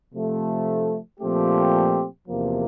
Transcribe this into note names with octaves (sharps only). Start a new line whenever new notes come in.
C3 F3 A3
A#2 F3 A3 C4 G4
E2 C3 F3 A#3